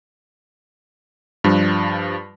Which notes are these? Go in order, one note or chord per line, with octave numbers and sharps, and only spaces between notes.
G2 F3 G3